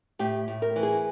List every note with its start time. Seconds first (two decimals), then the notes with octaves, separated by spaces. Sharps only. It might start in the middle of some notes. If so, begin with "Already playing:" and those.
0.19 A2 G4
0.48 A2
0.62 A#4
0.76 E3
0.83 G#4